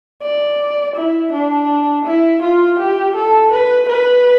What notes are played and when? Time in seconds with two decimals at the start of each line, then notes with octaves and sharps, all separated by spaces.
0.22 D5
0.95 E4
1.32 D4
2.06 E4
2.42 F4
2.79 G4
3.16 A4
3.52 B4
3.89 B4